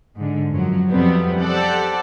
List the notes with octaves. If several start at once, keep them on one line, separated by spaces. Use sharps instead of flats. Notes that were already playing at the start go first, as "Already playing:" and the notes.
G#2 D3
F#2 F3 F#3
F2 C3 F#3 G3 B3 C4
G4 A4 C5 D5 F#5